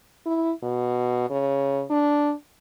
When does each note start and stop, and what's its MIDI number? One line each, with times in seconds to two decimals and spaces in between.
0.25 0.52 64
0.63 1.25 47
1.30 1.83 49
1.90 2.34 62